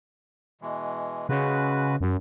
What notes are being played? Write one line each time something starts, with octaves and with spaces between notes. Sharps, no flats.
B2 E3 G#3
C#3 G#3 F#4 B4
F#2